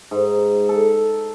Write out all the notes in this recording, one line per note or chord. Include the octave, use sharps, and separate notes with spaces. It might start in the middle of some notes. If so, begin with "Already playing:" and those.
G#2
A4